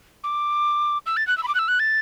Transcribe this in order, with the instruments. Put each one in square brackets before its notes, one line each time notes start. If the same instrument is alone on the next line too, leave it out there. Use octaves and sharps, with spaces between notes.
[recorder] D6
E6
A6
F#6
E6
B5
D6
F#6
E6
F#6
A6